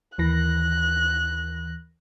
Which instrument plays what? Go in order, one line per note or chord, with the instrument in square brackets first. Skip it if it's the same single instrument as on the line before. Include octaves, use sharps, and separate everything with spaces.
[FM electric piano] D#2 E3 A#6 [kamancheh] F#6